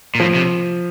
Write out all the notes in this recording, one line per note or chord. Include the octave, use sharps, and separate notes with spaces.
A#2
A2 F3
C3